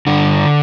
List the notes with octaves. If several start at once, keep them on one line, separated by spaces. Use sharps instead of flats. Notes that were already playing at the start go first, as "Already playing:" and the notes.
G2 D3 D4